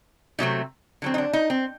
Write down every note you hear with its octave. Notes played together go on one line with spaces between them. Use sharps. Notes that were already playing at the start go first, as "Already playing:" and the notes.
C3 F#3 A3 C4 D#4
D3 F#3 C4
D#4
D4
D#4
C4